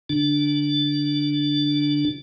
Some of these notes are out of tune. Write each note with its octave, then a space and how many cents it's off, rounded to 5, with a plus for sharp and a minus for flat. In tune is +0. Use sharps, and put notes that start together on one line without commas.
D3 -20 D4 +0